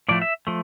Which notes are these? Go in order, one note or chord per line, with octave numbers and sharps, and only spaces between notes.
A2 F3 A3 D5
E5
F3 A3